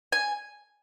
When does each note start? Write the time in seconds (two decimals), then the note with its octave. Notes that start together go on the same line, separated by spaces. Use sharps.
0.12 G#5